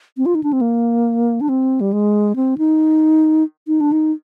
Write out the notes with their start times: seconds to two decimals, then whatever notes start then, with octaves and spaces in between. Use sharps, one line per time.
0.17 C4
0.26 F4
0.35 D#4
0.43 D4
0.53 C4
0.61 A#3
1.41 D4
1.49 C4
1.81 G3
1.93 G#3
2.36 C4
2.58 D#4
3.67 D#4
3.81 D4
3.92 D#4